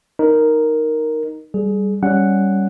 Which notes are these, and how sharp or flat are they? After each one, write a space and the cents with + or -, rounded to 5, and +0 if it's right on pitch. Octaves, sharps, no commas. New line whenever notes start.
D#4 +0 A#4 +0
G3 +0 G#4 +25
G3 +0 C#4 +0 F#5 +0